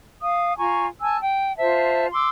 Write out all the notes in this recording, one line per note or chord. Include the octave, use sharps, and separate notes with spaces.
F5 D#6
F4 G#5 A#5 C#6
G#5 A5 E6
G5
F4 C5 E5 A5
C6 D6 E6